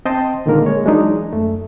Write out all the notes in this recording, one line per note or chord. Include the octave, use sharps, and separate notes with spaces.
C4 D#5 G5 A5 C6
A#2 D3 D#3 G#3 A#3 A#4
G#3 C#5
E3 F#3 G#3 D4 D#4
F#2 A3